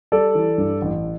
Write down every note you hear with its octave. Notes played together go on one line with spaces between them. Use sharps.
G3 A4 D5
E3
G2
A1